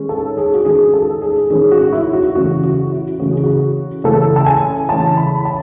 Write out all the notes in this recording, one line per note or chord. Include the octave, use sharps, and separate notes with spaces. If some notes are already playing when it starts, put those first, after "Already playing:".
Already playing: D#3 G#3 C#4
A4
G#4
F#4
D#3 G#3 C#4 G#4
A4
G#4
D#3 G#3 C#4 G#4
F#4
E4
F#4
C#3 E3 A3 C#4 F#4
F#4
E4
C#3 E3 A3 C#4 F#4
G#4
F#4
C#3 E3 A3 C#4 A4
A5
G#5
C#3 E3 A3 C#4 A5
B5
A5